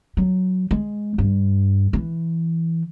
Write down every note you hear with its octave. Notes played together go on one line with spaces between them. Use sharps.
F#3
G#3
G2
E3